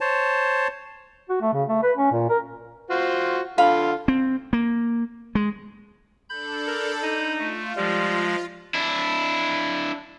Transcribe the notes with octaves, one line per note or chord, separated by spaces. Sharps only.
C5 C#5 A5
F#4
A3
C#3
A3
B4
C#4
A#2
A#4
F4 F#4 C5
D3 F4 A4 F5 B5
C4
A#3
G#3
D4 A4 B5 G6
A#4
D#4
A3 F4
F3 G3 G#3
D4 E4